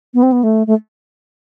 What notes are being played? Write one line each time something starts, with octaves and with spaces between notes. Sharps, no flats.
B3
C4
B3
A3
A3